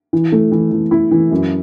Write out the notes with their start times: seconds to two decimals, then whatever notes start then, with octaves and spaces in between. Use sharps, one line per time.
0.13 E3
0.32 A3
0.52 E3
0.72 E3
0.91 E4
1.11 E3
1.31 F#2